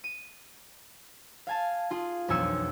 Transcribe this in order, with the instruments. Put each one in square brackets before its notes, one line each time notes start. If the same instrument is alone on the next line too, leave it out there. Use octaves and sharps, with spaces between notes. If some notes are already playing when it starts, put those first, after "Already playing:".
[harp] D#7
F5 G#5 A5
F4 G#4
E1 B1 F2 G#5 E6 C#7